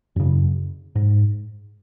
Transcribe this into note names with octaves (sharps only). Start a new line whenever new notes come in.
F#2 C#3
G#2